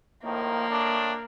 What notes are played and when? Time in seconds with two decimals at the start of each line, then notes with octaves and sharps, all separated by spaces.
0.24 A2 D#3 F3 A#3
0.70 A2 D4